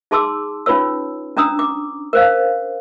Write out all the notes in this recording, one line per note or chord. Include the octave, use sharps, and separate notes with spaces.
D#4 G#4 A5 C6 D6 E6
C#4 D#4 F4 B4 C#5 E6
C#4 D4 A#5 D#6 E6
D6
A#4 C5 F5